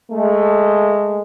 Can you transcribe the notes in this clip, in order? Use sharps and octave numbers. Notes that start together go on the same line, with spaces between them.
G#3 A3